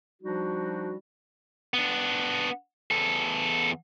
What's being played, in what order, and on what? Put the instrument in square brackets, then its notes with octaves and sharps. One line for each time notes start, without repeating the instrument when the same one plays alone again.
[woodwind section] F3 G3 D4 D#4 F#4
[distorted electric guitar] B3 D4
E2 A4